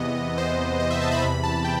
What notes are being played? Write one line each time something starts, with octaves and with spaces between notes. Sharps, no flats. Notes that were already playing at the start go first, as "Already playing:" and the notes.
Already playing: E2 C3 E3 B3 D#5
C5
D#5
E5
A5
B5
E2 C3 E3 B5
A5
G5